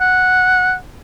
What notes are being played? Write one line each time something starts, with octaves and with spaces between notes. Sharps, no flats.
F#5